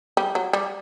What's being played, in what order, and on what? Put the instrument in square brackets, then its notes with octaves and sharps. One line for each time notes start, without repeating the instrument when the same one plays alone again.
[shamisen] G3
F#3
G3